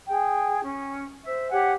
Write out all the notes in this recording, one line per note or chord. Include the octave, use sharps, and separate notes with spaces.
G#4 G5
C#4
C5 E5
G4 C#5 F#5 G#5